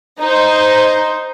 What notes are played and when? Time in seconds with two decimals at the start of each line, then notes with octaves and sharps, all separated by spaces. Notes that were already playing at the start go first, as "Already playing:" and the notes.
0.20 D#4 C5